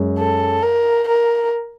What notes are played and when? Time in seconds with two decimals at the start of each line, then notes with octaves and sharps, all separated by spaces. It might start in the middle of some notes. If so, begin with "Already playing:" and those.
Already playing: F#2 G#3
0.19 A4
0.63 A#4
1.09 A#4